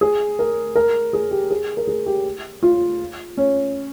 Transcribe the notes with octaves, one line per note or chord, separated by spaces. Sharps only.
G#4
A#4
A#4
G#4
G4
G#4
A#4
G#4
G4
F4
C#4